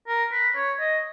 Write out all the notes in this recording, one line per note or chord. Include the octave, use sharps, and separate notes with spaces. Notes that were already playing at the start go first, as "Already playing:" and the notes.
A#4
B4
C#5
D#5